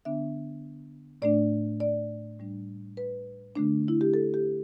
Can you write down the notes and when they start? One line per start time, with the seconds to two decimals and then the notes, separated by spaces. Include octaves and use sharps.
0.05 D3 B3 D4 E5
1.22 A2 A3 D4 D5
1.80 D5
2.39 A2 G3 D4
2.97 B4
3.55 D3 A3 D4
3.88 E4
4.01 G4
4.14 A4
4.34 G4